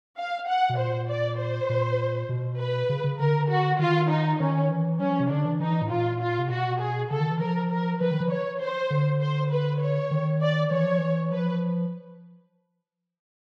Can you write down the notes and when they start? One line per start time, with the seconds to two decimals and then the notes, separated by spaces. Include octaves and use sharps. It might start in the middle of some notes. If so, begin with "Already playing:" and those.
0.18 F5
0.48 F#5
0.69 B2
0.78 A#2 C5
1.09 D5
1.39 C5
1.69 A#2
2.29 B2
2.59 B4
2.89 C#3
3.04 C#3
3.19 D3 A#4
3.49 F#4
3.79 D#3 F4
4.10 D#4
4.40 D#3 C#4
4.70 E3
5.00 F#3 C#4
5.09 F3
5.20 C3
5.30 D3 D4
5.45 E3
5.60 E3 D#4
5.82 A2
5.90 A#2 F4
6.20 F4
6.39 C3
6.50 B2 F#4
6.80 G#4
7.10 C#3 A4
7.20 D#3
7.31 E3
7.40 F3 A#4
7.71 A#4
8.01 F3 B4
8.11 D#3
8.20 F3
8.31 C#5
8.61 C5
8.90 D3
9.21 C5
9.51 B4
9.81 C#5
10.11 D#3
10.41 D5
10.71 E3 C#5
10.85 F3
10.99 E3
11.31 F3 B4